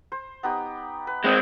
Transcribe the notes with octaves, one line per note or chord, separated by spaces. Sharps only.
C5
B3 D#4 G4
B4
G#3 C4